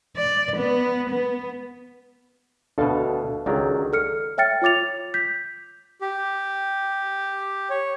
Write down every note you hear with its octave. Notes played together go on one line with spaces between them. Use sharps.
D5
B3
B3
D2 B2 D4 A4 F5
C#2 D#3 F#3 G#4 D5
A4 F6 C#7
C#5 E5 G5 F6 A6 C#7
F4 C#5 D6 A6 F7
G6 B6
G4
C#5